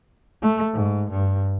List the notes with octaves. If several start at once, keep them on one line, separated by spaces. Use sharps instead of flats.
A3
G#2
G2